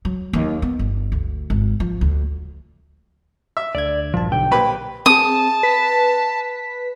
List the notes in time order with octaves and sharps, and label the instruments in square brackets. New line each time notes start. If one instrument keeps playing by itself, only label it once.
[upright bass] F#3
D#2
B3
G1
D2
G#1
F3
D2
[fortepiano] E5
[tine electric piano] D2 D3 G#6 [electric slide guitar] D5
[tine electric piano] A#1 G2 A5 [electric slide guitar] F3
[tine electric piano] B1 D3 [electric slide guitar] G5
[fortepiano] A#2 B4 B5 [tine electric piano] A#3 G4 C5
[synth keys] C4 G#4 [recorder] A5 [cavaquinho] D#6
[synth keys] B4 B6